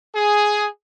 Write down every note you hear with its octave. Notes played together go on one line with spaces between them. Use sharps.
G#4